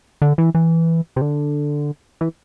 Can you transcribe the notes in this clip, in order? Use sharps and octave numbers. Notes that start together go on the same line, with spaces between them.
D3
E3
E3
C3
D3
E3